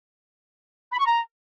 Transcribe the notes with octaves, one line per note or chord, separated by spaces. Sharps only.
B5
C#6
A#5